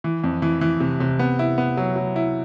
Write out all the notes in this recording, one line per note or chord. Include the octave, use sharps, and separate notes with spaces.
E3
F2
E3
E3
C3
C3
B3
E4
B3
F#3
F#3
E4